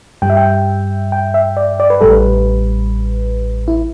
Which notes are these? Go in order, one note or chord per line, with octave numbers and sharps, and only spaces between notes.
G2 G3 G5
E5
G5
G5
E5
D5
D5
B4
A1 A2 G3 A4
B4
E4